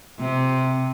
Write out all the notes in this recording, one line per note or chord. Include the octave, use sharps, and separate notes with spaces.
C3